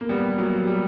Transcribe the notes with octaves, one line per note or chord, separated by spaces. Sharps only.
A#3
G3 B3
F#3 A#3
G3